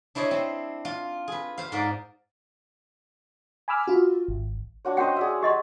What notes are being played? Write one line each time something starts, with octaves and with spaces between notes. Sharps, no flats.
D4 E4 C5 C#5 D#5
C4
F4
G#4 B4
C5 F5
G#2 A#4 D5
G#5 B5 D6 E6 F6
F4 F#4
G#1
D4 F#4 C#5
C#4 F#4 C5 D#5 F#5 G5
G#4 D5 E5
G4 D#5 C6